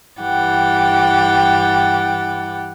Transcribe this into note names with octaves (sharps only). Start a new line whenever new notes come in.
G2 E3 G4 F#5 G5 A6